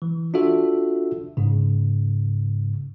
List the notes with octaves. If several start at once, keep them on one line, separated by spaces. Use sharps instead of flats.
E3
D4 F4 F#4 A4 E5
G#2 C#3